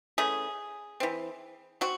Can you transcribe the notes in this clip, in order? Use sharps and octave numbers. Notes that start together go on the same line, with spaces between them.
E3 A3 C#4 G#4
E3 C4
C4 F#4